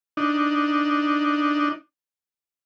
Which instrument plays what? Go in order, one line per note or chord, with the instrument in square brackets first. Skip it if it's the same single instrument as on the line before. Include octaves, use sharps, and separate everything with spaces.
[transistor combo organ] D4 D#4